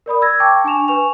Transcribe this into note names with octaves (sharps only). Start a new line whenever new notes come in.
A#4 D5 B5 D#6
E6 G#6 A#6
G5 A5 C#6 D6
D4 G#5 C#6 E7 F7
B4 G#5 C#6 F7